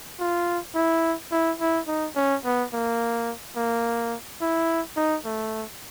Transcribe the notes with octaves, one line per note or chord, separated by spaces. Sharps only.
F4
E4
E4
E4
D#4
C#4
B3
A#3
A#3
E4
D#4
A3